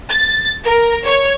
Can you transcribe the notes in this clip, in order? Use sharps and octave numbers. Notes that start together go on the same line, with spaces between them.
A6
A#4
C#5